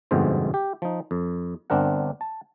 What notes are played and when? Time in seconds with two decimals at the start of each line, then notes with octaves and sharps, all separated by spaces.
0.11 G1 F2 G#2 B2 C5
0.54 G4
0.82 F3 D#4
1.11 F2
1.70 G1 C4 D4 A#4 F#5
2.21 A5